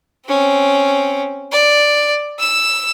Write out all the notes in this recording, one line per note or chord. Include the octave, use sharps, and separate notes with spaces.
C4 C#4
D5
E6 E7